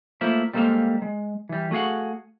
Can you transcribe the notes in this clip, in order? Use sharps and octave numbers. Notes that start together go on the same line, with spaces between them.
A3 A#3 E4 F4 C5 E5
G3 G#3 A#3 A4 C5 F5
G#3
E3 G3
A3 F#4 G#4 F5 F#5